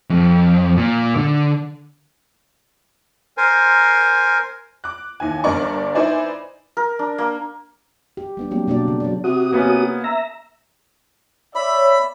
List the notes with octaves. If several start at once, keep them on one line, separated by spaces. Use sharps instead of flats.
F2
A#2
D3
A#4 C5 G#5
D6 F#6
D#2 E3 G#5
G1 G2 D4 A#4 D5 C#6
D#4 E4 B4 C5 D5 G#5
A#4
D4
A#3
G4
G3 B3 D4
F#3 A#3 C4 G4
B2 A#3 D4 F#4 D5
C#3
F#3 D5
C3 F#4 D#6
A#3 B3 C#4
E5 A#5
C#5 D5 E5 B5